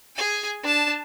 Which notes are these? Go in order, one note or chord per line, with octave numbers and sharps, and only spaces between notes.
G#4 G#5
D4 A5